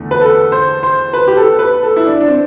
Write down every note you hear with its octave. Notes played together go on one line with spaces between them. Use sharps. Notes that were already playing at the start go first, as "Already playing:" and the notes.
Already playing: E2 D3 A3
B4
A4
C5
C5
B4
G4
A4
B4
A4
E4
D4
D4
C4